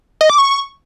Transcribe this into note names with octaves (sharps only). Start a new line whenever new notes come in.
D#5
D6
C#6